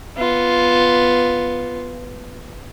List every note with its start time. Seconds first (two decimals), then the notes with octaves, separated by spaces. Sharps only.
0.18 B3 F4